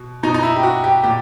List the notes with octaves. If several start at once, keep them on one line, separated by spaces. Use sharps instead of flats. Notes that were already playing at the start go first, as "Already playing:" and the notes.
Already playing: B2
B2 D#4
D#4
E4
G4
F#4
G4
A#2 G4